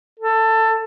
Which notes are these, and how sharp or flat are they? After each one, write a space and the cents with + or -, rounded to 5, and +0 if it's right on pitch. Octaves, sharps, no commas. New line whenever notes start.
A4 +15